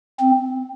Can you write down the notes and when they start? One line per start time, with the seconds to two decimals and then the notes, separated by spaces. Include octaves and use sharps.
0.20 C4